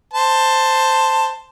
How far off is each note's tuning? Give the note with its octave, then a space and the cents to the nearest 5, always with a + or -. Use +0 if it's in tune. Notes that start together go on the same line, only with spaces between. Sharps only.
C5 +0 A5 +10